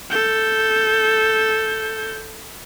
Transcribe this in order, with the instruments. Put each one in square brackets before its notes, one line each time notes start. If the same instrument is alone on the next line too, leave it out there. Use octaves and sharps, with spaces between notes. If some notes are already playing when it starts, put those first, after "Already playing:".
[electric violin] A4 G6